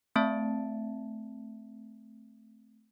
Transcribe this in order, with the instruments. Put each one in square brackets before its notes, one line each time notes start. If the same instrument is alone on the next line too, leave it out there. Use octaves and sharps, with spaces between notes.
[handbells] A3 C4 E5 A5